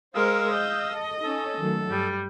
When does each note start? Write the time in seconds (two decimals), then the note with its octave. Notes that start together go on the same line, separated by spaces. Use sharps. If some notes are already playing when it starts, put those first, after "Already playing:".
0.15 G#3 A#4 C5 F5 D#6 E6
0.53 D#5 G6
0.93 A4
1.23 C#4 D#4 A4
1.58 D#3 F#3 A3
1.89 G2 G3